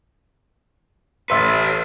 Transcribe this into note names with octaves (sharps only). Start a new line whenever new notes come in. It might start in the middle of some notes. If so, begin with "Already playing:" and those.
A1 A4 B4 E5 C6